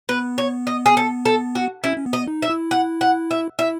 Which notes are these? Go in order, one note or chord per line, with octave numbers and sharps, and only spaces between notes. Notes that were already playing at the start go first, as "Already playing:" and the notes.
B3 B4
C#5
D#5
G#4
A4
A4
F#4
C#4 E4
C#4
B3
D#5
D#4
E5
E4
F#5
F#5
E5
E4 E5